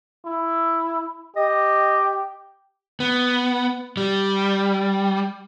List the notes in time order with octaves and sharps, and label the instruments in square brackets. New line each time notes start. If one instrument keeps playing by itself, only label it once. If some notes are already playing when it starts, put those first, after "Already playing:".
[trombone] E4
[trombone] G4 [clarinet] D#5
[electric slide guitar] B3
G3